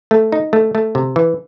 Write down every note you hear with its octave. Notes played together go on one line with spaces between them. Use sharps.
A3
D#4
A3
A3
C3
E3